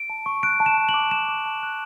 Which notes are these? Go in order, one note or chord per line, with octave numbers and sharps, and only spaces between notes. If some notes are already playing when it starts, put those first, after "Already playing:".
Already playing: D7
A5
C#6
F#6 D7
A5
E7
A5
F#7
D6
D6 E7
D6
A5
F#6